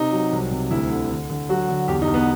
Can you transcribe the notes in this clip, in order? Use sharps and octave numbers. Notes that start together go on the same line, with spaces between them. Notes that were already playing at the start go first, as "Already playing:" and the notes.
Already playing: C3 D#4
F#3
C2
C3
D2 E4
D3
D3
D3
F#3 F#4
D3
E2 G4
D#4
E2
B3